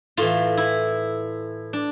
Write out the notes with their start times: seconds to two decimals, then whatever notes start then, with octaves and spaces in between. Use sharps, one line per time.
0.17 A2 E3 F4
0.57 E4
1.73 D4